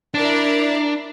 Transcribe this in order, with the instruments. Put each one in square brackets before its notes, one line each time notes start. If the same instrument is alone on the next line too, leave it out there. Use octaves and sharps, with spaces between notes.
[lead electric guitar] D4 [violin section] E4 A#4 D5